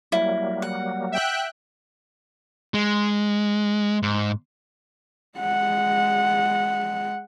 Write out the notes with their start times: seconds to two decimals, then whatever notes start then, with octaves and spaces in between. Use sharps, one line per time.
0.12 F#3 G3 A#3 E4
0.62 F#5
1.12 E5 G5 F#6
2.74 G#3
4.03 G#2
5.39 G#3 F#5